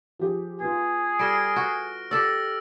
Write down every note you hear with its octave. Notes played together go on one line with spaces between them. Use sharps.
F3 G4 G#4
B3 F4 G#4
G3 A4 F6 A#6 D7
F#4
G4 A4 D5 E6 A#6